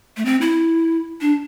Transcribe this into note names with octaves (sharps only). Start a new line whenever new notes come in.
A3
C4
E4
D4